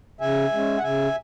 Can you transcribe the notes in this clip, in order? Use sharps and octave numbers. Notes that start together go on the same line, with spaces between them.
C#3 E5 G#5
G#3 C#4
F#5
C#3 E5 G#5